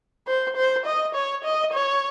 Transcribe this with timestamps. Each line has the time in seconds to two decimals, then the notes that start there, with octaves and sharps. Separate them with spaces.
0.27 C5
0.56 C5
0.85 D#5
1.14 C#5
1.44 D#5
1.73 C#5